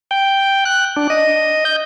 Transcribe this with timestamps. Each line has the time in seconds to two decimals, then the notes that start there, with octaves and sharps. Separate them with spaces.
0.11 G5
0.65 F#6
0.96 D4
1.10 D#5
1.65 G6